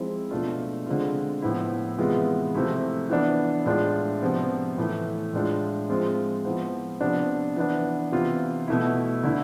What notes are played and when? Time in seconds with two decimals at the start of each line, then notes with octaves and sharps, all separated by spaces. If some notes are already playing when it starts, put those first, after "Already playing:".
Already playing: F3 G#3 C4 E4
0.31 B2 A3 D4 F4
0.86 D3 G#3 C4 F4
1.42 A2 F3 B3 E4
1.98 C3 E3 G#3 B3 F4
2.54 C3 F3 A3 E4
3.09 E3 B3 D4
3.66 A2 G#3 D4 F4
4.22 C3 F3 B3
4.77 A2 E3 A3 E4
5.33 A2 G#3 D4 F4
5.89 F3 G#3 C4 F4
6.45 F3 B3 E4
7.01 C3 F3 B3 D4
7.56 E3 B3 D4
8.12 C3 E3 B3 F4
8.68 B2 A3 E4
9.23 D3 A3 E4